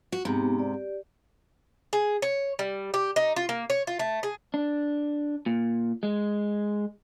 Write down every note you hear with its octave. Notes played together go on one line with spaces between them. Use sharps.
F#4
G#2 C3 B3 D#4 G4
G4 D5
G#4
C#5
G3
G4
D#4
F4
A#3
C#5
F4
A3
G#4
D4
A#2
G#3